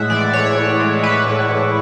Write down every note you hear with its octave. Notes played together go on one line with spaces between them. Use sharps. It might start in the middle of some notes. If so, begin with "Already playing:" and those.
Already playing: A2 G#3 E5 F#5
E3 D5
A2 C#5
A2
G#3
E3 B4
A2
A2